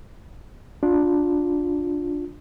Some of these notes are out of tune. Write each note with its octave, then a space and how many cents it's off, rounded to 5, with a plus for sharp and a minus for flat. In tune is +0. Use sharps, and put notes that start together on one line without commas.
D4 +0 F4 +20